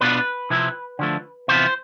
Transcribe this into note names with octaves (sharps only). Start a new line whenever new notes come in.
B2 B3 D4 F4 B4
C3 F3 C4 E4
D3 F3 A3
C3 E3 B3 F4 C5